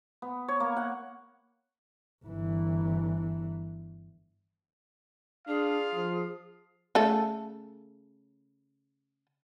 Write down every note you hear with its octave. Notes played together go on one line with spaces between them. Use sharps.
B3
C#5
A#3
F#5
G1 E3
D4 F4 G#4 F5
F3
C#3 A3 A4